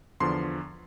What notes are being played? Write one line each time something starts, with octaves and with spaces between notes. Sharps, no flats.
E2 D3 F3 C6